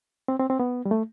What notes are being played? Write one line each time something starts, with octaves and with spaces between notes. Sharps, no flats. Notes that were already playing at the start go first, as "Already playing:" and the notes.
C4
C4
C4
B3
G3
A3